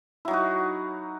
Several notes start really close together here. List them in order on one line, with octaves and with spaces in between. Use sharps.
E4 F#3 D#4 F#4